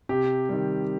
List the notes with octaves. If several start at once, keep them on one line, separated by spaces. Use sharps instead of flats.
C3 G4
D#3 G3